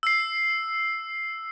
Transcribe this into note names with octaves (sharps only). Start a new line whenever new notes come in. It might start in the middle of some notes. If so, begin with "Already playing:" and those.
E6 C7